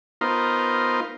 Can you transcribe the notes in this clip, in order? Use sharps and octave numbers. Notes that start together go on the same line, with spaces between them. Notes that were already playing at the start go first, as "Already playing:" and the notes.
B3 D#4 F4 A#4 C5